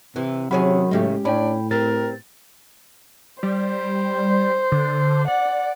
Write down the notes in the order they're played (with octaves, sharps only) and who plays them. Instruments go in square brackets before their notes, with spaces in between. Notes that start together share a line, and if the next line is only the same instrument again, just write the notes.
[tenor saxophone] C3 [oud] E3
[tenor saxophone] C3 [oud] D#3 C#4 G#4 [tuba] F#3 [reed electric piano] F#5 B5
[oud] A2 C#3 D#4 [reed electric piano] G#3 C#4 G4 [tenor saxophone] A3
[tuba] A2 [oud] C#4 [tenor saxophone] D4 [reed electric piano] G5 B5
[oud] G3 C4 B4 [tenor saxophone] A#4 [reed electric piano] A6
[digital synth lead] G3 [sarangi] C5
[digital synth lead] D3
[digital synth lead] D5 [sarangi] F#5